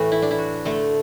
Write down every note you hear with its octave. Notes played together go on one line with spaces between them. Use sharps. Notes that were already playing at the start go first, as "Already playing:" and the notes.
Already playing: A2 E3 A3 F#4 A4
E4
D4
E4
F#4
D3 A3 A4